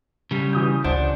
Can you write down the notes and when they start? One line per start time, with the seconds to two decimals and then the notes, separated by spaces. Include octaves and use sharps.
0.31 C#3 G3
0.53 E3 D#6 G6
0.84 C#2 D4 C5 F#5 G6